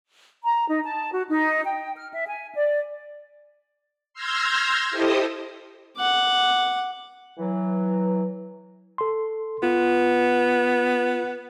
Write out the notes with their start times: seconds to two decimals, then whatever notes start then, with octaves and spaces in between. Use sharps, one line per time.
0.44 A#5
0.68 D#4
0.84 A5
1.13 F#4
1.29 D#4
1.65 G5
1.97 F6
2.14 E5
2.27 G#5
2.54 D5
4.14 C6 E6 F6 G6 G#6 A#6
4.91 E4 G4 A4 C5 D#5 D#6
5.97 F#5 D6
7.38 E3 F#3
8.98 A4 C6
9.63 B3 F4